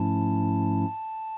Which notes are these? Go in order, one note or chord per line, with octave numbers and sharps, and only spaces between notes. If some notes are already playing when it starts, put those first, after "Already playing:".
Already playing: G#2 F3 A3 C#4 E4 A5